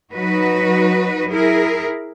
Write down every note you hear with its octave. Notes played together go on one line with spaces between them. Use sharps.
F#3 D#4 F#4 B4
E4 G#4 A#4